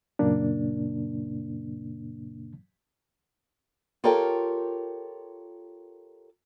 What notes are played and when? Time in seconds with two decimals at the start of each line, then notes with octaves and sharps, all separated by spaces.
0.19 F#2 A#2 C#3 A#3 D4
4.04 F4 G4 A4 A#4 C#5 G5